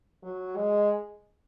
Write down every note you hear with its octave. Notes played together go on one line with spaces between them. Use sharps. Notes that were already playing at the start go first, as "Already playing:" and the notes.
F#3
G#3